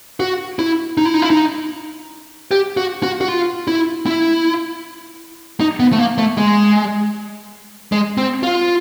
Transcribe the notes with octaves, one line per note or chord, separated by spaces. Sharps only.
F#4
E4
D#4
E4
D#4
E4
D#4
G4
F#4
F#4
F#4
F4
E4
E4
D#4
B3
A3
A#3
A3
G#3
G#3
C4
F4